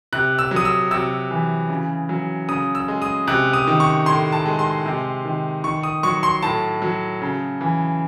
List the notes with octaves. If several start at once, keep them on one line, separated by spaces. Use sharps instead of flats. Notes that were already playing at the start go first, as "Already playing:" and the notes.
C3 F#6
E6
F#3
D#6
E6
C3 E6
E3
C#3
F#3
C#3 D#6
E6
G#3
D#6
C3 F#6
D#6
D#3
C#6
A2 C6
A5
G#3
C6
C3
D#3
D#3 C#6
D#6
F#3 C#6
C6
A2 A5
F#3
C#3
E3